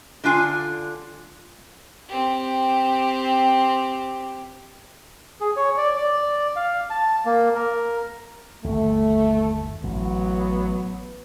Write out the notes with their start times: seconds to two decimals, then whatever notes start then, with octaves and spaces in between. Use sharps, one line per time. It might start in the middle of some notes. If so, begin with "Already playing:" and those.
0.24 D3 D4 F4 G#5
2.08 C4 G4
5.41 G#4
5.56 C#5
5.77 D5
5.96 D5
6.56 F5
6.90 A5
7.25 A#3
7.55 A#4
8.64 G1 D#2 A3
9.84 A1 F#3 B3